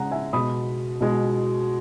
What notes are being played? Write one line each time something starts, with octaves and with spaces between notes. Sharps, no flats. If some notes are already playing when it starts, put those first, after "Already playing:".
Already playing: C#3 G#3 F#5 A#5
E5 G#5
B2 G#3 B5 D#6
B2 G#3